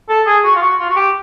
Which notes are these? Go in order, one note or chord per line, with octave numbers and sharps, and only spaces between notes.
A4
G#4
F#4
F4
F#4
F4
F#4
G4